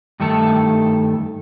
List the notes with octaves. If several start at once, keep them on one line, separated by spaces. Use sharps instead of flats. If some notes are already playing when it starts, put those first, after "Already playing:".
G2 D#3 A3 A4